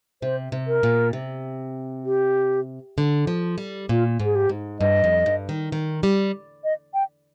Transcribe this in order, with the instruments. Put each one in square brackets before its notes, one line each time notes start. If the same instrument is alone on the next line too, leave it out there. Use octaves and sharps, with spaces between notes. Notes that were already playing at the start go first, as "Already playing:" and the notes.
[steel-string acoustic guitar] C3 [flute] C5
[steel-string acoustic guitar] C3
[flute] A#4
[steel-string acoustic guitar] A#2
C3
[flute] G4
[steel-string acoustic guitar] D3
F3
G3
[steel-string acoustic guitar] A#2 [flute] F4
[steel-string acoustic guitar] G#2
[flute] G#4
G4
[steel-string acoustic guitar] G#2
[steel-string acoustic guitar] G2 [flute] D#5
[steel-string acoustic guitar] F2
G2
D#3
D#3
G3
[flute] D#5
G5